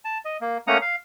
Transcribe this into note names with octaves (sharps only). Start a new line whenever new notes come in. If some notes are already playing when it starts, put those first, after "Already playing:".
A5
D#5
A#3
A3 A#3 C#4 F#5 A#5 D#6
F5